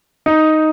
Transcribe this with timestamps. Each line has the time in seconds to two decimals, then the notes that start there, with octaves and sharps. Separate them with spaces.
0.26 D#4